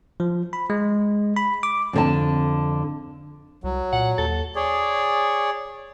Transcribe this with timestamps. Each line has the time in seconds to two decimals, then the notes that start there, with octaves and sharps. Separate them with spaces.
0.20 F3
0.53 B5
0.70 G#3
1.36 B5
1.63 D6
1.93 F2 D3 A5
3.64 C2 F#3
3.93 A#2 F#5
4.18 D#2 A4
4.55 G#4 C#5 D5